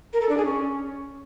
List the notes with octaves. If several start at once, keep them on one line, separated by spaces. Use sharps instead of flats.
A#4
A4
D4
G#4
C#4